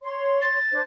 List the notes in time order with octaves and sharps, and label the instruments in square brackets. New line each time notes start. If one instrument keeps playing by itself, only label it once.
[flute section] C#5 C6
[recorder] A6
[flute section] D4 C5